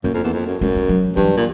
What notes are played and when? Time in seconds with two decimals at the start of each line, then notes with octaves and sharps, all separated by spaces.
0.04 F#2 A#3
0.14 F2
0.24 E2
0.33 F2
0.47 F#2
0.61 F#2 G#3
0.75 G3
0.89 F#3
1.16 G2 E3
1.37 A#2